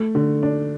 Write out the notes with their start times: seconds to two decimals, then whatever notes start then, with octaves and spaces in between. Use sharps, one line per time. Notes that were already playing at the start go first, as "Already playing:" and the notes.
Already playing: A3
0.15 D3
0.43 D4